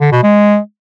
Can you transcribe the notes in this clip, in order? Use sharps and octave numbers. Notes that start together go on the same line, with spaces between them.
D3
B2
G#3